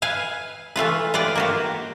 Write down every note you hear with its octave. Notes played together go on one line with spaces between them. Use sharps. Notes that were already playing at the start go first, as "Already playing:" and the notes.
B4 F5 G#5
E3 A3 F4 B4
F4 B4 D5 G5
A#3 F#4 G4